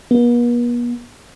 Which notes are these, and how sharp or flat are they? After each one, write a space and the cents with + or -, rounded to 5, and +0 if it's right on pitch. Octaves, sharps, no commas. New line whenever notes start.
B3 -45